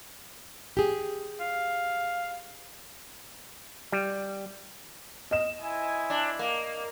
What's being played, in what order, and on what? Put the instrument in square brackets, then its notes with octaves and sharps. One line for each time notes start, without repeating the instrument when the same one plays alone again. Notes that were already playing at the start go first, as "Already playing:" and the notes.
[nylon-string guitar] G4 G#4
[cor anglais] F5
[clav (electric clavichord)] G3
[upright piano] D#5 E7
[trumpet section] E4 C5 G#5
[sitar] D4
A#3